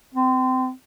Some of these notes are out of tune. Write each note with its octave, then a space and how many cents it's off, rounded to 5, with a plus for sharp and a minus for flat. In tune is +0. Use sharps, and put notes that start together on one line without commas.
C4 -25